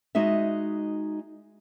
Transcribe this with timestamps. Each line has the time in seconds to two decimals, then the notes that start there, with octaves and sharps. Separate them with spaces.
0.15 G#3 D#4 F#4 E5